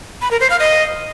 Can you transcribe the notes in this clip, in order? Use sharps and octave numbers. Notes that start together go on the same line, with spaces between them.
B5
A#4
C5
F5
D#5